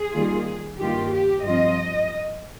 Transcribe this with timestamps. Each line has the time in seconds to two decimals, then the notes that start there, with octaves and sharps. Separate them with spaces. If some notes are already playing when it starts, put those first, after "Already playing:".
Already playing: G#4
0.12 D#3 G3 A#3 F4
0.78 G2 D#3 A#3 F4 G4
1.12 G4
1.45 G2 F3 C4 F4 D#5